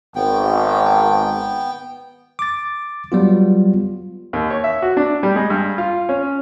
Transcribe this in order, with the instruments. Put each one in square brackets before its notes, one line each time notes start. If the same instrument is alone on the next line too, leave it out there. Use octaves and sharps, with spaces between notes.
[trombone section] G#1 [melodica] B3 G5
[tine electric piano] D6 A6
F#3 G3 B3 F4
[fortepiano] D#2
C#5
E5
F#4
D4
G3
G#3
G2
F4
C#4